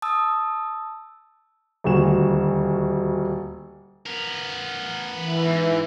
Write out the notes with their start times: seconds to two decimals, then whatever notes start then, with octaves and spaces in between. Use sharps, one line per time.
0.02 A5 D#6 E6
1.84 D#1 D2 F#4 E7
4.06 B3 A#4
5.12 E3
5.45 G#2